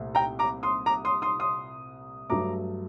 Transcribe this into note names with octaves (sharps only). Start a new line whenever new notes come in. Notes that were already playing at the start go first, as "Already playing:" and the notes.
Already playing: C2 A#2 A3
G5 A#5
A#5 D6
C6 D#6
A#5 D6
C6 D#6
C6 D#6
C6 D#6
G2 F#3 A3 A#5 D6